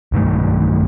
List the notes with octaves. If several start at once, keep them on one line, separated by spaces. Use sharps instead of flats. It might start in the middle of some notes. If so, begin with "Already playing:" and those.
B1 G2 D#3 A3